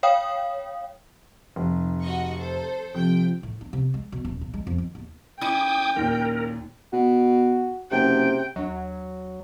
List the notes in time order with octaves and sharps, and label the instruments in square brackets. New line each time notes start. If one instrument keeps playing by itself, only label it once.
[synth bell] C#5 F5 G5 D#6
[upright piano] F1
[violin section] F#4 D#5 C#6
A4 C5
[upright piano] C3 [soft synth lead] F3 [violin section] G5
[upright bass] A2
D4
C3
G#3
B2
D#1
A#2
G#3
F2
D#3
D#2
[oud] C#4 D#4 E4 [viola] G5 [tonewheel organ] G#5 D6 D#6
[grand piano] D#2 A#2 [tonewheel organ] A#4
[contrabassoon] B2 [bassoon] F#4
[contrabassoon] F#1 [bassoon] C3 [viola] G5
[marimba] D#2 D4 [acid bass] F#3